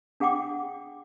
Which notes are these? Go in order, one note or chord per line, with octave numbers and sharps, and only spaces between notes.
D4 G#4 F#5 G5 D6